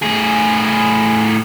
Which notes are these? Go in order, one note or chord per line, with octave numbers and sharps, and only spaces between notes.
A2 G#4